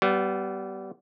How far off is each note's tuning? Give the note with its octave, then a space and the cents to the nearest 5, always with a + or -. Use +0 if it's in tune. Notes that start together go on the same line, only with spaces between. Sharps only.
G3 -25 B3 +0